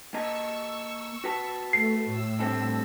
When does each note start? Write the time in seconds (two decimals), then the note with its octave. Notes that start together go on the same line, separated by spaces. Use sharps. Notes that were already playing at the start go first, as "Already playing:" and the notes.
0.14 A#3 D#5 A5 C#6 E6
1.24 F#4 B4 A5
1.73 A3 C7
2.05 A2 E6
2.40 G2 C4 A4